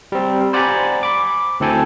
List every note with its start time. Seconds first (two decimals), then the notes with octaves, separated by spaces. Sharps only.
0.12 G3 C4
0.53 C5 D5 F#5 G#5 A#5 B5
1.03 B5 D6
1.60 D2 C4 E4 A4 G5 G#5